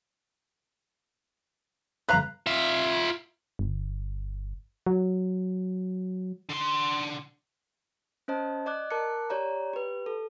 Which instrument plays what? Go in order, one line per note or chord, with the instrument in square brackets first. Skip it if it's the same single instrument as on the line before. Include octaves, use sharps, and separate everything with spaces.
[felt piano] G1 F#6 [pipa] B4 F5 A#5
[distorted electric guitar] F4 E5
[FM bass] G1
F#3
[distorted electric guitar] D3 C6
[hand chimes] C#4 C5 D#5 A5
D5 D#5 D6 F#6
A#4 A5 D6 F#6 C#7
G4 C#5 D5 A#5
G4 B4
A4